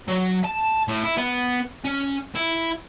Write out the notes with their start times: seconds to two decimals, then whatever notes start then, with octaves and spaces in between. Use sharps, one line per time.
0.08 F#3
0.45 A5
0.88 A2
1.03 E4
1.17 B3
1.85 C#4
2.35 E4